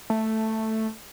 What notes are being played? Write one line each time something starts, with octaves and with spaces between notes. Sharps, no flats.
A3